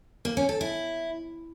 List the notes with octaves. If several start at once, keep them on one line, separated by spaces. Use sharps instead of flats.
A#3
C#4
A4
E4